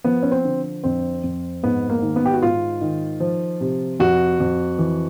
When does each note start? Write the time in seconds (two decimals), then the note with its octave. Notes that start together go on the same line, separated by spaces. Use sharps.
0.04 F3 B3
0.23 C#4
0.31 C4
0.44 D3
0.84 F2 C4
1.24 F2
1.63 G#2 B3
1.89 A#3
2.02 D#3
2.16 B3
2.25 G4
2.34 F#4
2.42 G#2 F4
2.81 D#3
3.20 F3
3.61 C3
3.99 F2 F#4
4.40 F2
4.79 E3